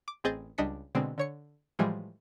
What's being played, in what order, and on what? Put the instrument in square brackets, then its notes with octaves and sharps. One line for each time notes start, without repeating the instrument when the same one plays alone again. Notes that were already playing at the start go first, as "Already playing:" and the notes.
[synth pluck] D6
A1 C4 G#4 D#5 G6 A6
C#2 G3 D4 D#5 B6 C#7
B2 D3 G#3 C4
D3 C#5 C#7
A2 E3 F3 G3 G#3